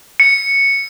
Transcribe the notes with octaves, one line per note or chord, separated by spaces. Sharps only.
C#7